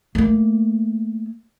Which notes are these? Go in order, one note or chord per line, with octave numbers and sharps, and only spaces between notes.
A3 A#3